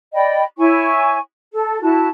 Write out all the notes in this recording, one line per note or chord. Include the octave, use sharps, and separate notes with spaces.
D5 D#5 G5 B5
E4 C#5 G#5 C#6
A4
E4 F#4 A5